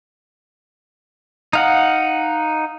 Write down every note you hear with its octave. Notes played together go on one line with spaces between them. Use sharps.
D#4 F5 F#5